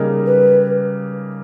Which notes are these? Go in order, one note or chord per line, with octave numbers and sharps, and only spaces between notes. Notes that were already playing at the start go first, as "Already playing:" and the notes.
Already playing: C#3 G3 A#3 D#4 A#4
B4